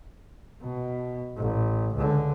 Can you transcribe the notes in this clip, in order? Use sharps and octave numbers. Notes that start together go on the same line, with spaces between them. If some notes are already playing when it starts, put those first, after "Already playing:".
B2
A1
C#2 D3